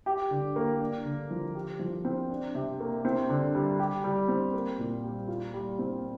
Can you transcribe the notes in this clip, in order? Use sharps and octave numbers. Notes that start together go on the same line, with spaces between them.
G4
D3
A#3
D4
D3
F3
G4
F3
C4
D4
C3
A#3
C4
D3
G3
G4
G3
C4
A#3
A#2
G3
F4
G3
C4